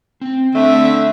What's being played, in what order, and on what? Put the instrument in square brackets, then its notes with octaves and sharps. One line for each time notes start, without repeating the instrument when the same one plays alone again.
[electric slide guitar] C4 G5
[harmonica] D3 [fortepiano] A3 [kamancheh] E5